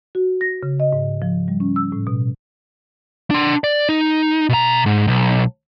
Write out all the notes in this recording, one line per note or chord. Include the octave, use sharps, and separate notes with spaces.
F#4
A#6
C#3
D#5
G#2
F3
G3
C#4
E6
A2
B2
D4 C6
D5
D#4
B2 A#5
G#2
B1